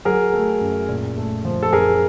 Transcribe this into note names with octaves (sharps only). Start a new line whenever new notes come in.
F#3 G#4 A#4
A3
F#2
A#2
A3
F3
A4
F#2 G#4 A#4